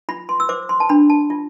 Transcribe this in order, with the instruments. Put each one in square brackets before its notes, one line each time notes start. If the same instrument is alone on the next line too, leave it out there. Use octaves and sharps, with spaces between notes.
[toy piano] F4 B5
C6
E6
C5 D6
C6
A5
D4 B5
A5
F4